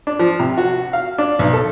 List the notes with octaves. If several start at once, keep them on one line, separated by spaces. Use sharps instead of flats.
D4
F3
C3
F#4
F5
D4
B1
A4